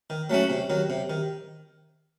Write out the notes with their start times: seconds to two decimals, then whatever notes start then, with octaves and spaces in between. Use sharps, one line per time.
0.10 D#3
0.30 F#3 A3 C#4 F#4
0.50 C3
0.70 D#3 F#3
0.90 C3
1.10 D#3